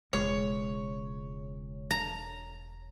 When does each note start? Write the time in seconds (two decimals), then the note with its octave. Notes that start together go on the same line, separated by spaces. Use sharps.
0.13 E1 C#2 G#3 C#5
1.91 A#5